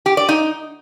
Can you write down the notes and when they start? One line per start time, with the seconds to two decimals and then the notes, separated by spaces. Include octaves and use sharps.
0.06 G4
0.17 D5
0.29 D#4